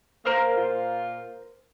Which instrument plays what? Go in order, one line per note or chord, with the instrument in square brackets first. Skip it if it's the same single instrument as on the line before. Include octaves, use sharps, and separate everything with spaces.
[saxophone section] A#3 [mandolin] A#4 C5 F6
[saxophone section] A#2 F4